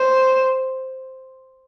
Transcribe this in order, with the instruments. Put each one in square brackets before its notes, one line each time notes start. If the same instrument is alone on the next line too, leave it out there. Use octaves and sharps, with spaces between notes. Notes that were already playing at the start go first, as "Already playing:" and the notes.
Already playing: [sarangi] C5